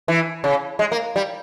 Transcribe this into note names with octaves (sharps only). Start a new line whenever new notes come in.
E3
C#3
G#3
A#3
G3